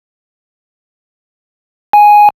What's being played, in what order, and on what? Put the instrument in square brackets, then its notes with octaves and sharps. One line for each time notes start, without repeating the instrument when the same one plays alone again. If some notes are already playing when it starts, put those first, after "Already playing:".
[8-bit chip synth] G#5